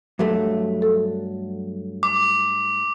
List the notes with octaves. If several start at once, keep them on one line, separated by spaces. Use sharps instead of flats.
G2 F#3 A3
A4
D6